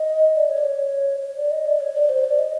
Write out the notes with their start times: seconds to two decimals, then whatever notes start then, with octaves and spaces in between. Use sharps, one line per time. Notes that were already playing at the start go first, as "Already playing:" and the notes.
Already playing: D#5
0.35 D5
0.49 C#5
0.58 D5
0.64 C#5
1.22 C#5
1.36 D5
1.51 D#5
1.66 D5
1.80 C#5
1.95 D5
2.09 C5
2.24 D5
2.39 D#5